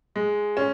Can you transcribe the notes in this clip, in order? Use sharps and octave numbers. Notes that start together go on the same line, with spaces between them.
G#3
C#4